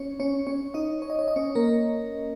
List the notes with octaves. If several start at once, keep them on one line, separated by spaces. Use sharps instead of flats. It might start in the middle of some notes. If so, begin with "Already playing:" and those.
Already playing: C#4 C#5
C#4 C#5
C#4 C#5
D#4 D#5
C#5
D#5
C#5
D#5
C#4 C#5
A#3 A#4